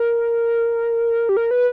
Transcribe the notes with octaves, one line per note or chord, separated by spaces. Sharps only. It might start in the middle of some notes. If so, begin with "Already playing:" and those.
Already playing: A#4
G4
A#4
B4